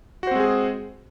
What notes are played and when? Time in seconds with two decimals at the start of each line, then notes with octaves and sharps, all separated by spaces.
0.23 F#4
0.27 C5
0.31 C4
0.36 G#3
0.40 G#4